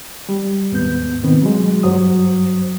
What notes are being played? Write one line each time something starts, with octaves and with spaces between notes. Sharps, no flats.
G3
D#2 G#2 B3 G6
B2 D#3 B3 C4
F#3 G#3
G2 F#3 C5 D#6